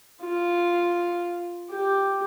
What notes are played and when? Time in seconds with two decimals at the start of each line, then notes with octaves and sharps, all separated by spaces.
0.22 F4
1.71 G4